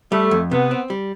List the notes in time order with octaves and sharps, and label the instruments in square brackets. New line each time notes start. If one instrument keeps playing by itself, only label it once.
[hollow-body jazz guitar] G3 [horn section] A3
[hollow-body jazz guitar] F2
[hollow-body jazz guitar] C3 [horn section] B3
[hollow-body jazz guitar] C4
G3